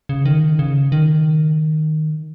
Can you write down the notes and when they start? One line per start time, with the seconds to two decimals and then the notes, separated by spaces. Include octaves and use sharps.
0.09 C#3
0.25 D#3
0.59 C#3
0.92 D#3